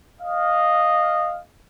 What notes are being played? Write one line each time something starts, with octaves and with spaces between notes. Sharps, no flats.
D#5 F5